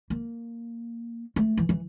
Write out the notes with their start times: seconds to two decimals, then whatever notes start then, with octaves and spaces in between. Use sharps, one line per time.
0.10 A#3
1.36 A3
1.57 E3
1.69 E3